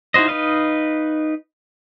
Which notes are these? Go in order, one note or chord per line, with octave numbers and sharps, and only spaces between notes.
D#4 E4 F#4 C5 D#5
D#4 B4 D#5 F5